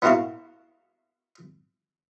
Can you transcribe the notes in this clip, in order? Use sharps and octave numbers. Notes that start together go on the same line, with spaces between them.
B3 D#4 E4 F#4 A#4 F5